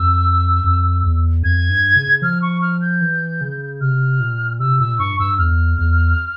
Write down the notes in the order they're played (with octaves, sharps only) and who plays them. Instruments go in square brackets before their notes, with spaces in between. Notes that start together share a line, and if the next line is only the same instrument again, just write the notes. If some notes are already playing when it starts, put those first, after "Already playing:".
Already playing: [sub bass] F2 [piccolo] E6
[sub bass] F2
E2
[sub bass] F2 [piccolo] G#6
[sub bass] G2
C#3
[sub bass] F3 [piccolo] F6
[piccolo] C#6
F6
G6
[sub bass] E3
C#3
[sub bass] C3 [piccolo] F6
[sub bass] A#2
[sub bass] C3 [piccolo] E6
[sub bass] A#2 [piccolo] E6
[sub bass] G2 [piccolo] C#6
[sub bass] G2 [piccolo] E6
[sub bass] E2 [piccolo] F6
[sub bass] E2